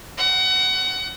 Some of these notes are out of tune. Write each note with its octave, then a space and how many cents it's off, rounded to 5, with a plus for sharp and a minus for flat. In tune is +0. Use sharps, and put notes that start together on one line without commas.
F#5 +25